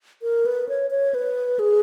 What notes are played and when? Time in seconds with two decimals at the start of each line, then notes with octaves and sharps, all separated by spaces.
0.22 A#4
0.46 B4
0.69 C#5
0.91 C#5
1.14 B4
1.59 G#4